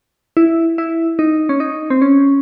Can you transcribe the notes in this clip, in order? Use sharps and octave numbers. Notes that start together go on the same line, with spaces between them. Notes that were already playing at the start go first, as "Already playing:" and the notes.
E4
E4
D#4
C#4
D#4
C4
C#4